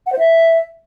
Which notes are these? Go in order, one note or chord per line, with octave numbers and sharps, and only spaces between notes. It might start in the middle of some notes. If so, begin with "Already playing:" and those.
F#5
C5
E5